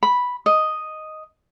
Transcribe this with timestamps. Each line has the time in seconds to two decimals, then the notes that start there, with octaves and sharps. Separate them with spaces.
0.03 B5
0.46 D#5